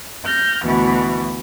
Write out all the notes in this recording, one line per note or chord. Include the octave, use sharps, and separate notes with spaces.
F6 G6 A#6
D2 B2 E3